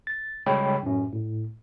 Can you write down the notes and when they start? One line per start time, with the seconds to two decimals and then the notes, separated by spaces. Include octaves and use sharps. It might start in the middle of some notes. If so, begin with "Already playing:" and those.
0.07 A6
0.46 C#3 G3 G#3 C#5 G5 B5
0.83 F#2 A2 C#4
1.13 A2